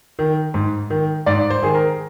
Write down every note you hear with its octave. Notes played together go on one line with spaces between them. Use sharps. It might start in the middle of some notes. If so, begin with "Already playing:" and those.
D#3
G#2
D#3
G#2 D5
C5
D#3 G#4
A#4